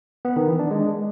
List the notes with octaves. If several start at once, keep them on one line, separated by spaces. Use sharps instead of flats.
B3
D#3
E3
D4
G#3